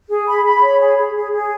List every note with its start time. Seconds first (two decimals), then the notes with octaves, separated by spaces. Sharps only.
0.10 G#4
0.28 B5
0.46 B5
0.62 C#5
0.80 G#4
0.98 G#4
1.16 G#4
1.33 G#4